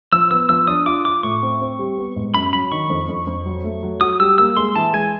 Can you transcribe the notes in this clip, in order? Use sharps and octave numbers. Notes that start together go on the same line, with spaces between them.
F3 E6
B3 E6
F3 E6
D4 D#6
F4 D6
F4 D6
A2 C#6
C4
C4
G3
B3
G#2
F#2 B5
F#3 B5
D#3 C#6
F2
F2
F2
F#3
A3
F#3
F#4 D#6
G3 E6
A#3 E6
G#3 C6
E3 A5
G#3 G#5